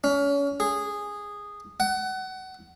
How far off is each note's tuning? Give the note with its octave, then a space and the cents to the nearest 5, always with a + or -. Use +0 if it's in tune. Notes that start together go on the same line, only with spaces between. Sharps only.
C#4 +30
G#4 -10
F#5 +25